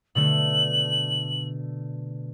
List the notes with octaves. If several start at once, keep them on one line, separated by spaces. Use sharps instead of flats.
B2 D3 A3 F#7